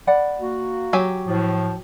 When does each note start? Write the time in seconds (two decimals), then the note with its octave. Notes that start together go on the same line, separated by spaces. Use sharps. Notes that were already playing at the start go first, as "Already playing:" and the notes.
0.07 D5 F#5 B5
0.40 A#3 F#4
0.93 F#3 G4 G#5
1.27 A2 F3